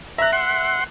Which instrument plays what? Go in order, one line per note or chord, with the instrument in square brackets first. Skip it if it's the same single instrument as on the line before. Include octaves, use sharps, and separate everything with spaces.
[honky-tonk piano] E5 F#6 [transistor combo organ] A#5
[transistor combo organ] F#5 C6